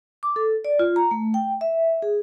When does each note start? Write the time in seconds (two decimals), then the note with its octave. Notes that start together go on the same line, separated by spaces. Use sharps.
0.23 D6
0.36 A4
0.65 D5
0.79 F4
0.96 A#5
1.11 A3
1.34 G5
1.61 E5
2.02 G#4